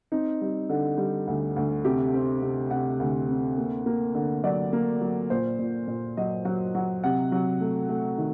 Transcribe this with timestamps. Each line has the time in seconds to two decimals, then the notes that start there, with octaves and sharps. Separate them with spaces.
0.12 C4 D#4
0.41 G3
0.69 D3
0.98 G3
1.27 D2
1.56 D2
1.85 C3 G4
2.14 C4
2.42 C3
2.71 C3 F#5
3.00 D2
3.29 C4
3.58 A#3
3.86 A#3
4.15 D3
4.44 F#3 D5
4.73 A#3
5.01 F#3
5.30 A#2 C5
5.59 A#2
5.88 A#2
6.17 F#3 D#5
6.45 F#3 F#5
6.75 F#3
7.04 C3 F#5
7.32 F#3
7.61 A3
7.89 A3
8.18 D#3